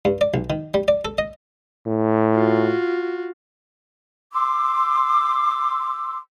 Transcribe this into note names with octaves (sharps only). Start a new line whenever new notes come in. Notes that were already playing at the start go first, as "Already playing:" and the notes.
G2
D5
B1
D#3
G3
D5
A4
D#5
A2
F4 F#4
C6 D6 E6